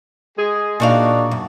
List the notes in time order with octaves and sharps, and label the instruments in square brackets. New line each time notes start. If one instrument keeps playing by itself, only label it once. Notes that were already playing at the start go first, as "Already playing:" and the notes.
[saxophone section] G#3 G#4
[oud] A#2 F#4 F5 [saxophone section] D4 D#4 D5
[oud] F#2